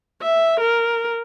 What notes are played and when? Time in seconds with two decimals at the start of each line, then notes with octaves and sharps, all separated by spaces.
0.22 E5
0.60 A#4